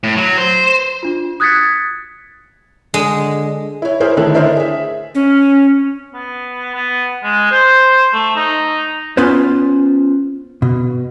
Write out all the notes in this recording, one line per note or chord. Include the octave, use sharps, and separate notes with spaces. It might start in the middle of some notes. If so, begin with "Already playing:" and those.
A2
F#3
C5
D4 F4
D#6 F#6 G#6 A6 B6 C#7
D3 G#3
E4 C#5
E4 G#4 A#4 C5 C#5 E5
D3 D#3 A3 E4 A4
D4 E4 A#4 C5 C#5 D#5
G#4 E5
C#4
B3
B3
G#3
C5
A3
D#4
B3 C#4 F4 B4 C5
B2